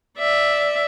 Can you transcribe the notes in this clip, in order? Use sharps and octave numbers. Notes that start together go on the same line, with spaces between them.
D5 E5